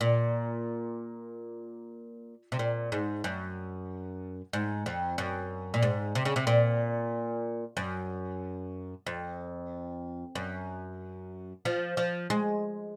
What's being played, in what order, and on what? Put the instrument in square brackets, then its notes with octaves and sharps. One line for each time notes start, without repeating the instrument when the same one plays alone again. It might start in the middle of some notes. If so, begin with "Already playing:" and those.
[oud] A#2
C3
A#2
G#2
F#2
G#2
F2
F#2
A#2
G#2
C3
C#3
C3
A#2
F#2
F2
F#2
F3
F3
G#3